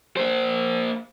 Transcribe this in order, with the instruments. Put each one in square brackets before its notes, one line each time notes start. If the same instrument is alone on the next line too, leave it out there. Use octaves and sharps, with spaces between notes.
[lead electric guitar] A#3 C5